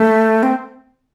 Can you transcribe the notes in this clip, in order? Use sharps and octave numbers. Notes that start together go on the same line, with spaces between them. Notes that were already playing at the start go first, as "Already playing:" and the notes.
Already playing: A3
C4